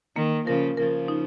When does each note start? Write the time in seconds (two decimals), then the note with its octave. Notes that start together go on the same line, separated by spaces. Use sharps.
0.16 D#3 A#3
0.46 C#3 F3 A#4
0.77 C#3 F3 A#4
1.08 D#4